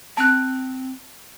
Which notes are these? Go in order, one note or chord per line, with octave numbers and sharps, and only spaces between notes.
C4 A5 F#6